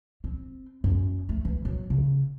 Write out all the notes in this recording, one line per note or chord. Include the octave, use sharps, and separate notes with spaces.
C4
F#2
A3
E3
F#3
C#3